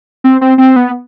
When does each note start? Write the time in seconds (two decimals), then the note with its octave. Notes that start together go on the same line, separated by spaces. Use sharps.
0.24 C4
0.41 C4
0.58 C4
0.76 B3